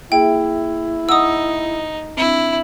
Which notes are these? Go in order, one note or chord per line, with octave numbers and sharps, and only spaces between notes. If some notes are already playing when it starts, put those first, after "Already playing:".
A#3 E4 G#4 E5 G5
D#4 F#5 D#6 E6
C4 D4 E4